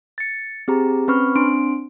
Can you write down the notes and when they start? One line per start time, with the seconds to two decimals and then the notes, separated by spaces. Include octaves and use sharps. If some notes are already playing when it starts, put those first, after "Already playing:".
0.18 A6 C#7
0.68 C4 G4 G#4 A#5
1.08 C4 C#4 B4 B5 C#6 F6
1.35 C4 D4 C6 D7